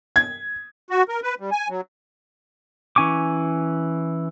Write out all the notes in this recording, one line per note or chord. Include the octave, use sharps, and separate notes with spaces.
G#6
F#4
A#4
B4
G3
G#5
F#3
E3 C#4 G#5 C#6 D6